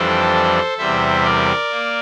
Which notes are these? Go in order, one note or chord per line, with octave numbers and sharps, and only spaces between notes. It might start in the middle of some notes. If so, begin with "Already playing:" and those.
Already playing: F2 E3 G3 D4 A4 C5
E2 C3 G3 C5 E5
A#4 D5
A#3